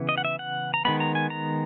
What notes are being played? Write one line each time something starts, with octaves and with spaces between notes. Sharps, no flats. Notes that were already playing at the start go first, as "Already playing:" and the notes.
Already playing: C#3 E3 B3
D#5
F#5
E5
F#5
A#5
D#3 G#3 B3 B5
A#5
G#5
A#5